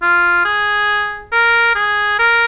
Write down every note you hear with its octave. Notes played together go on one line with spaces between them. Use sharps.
F4
G#4
A#4
G#4
A#4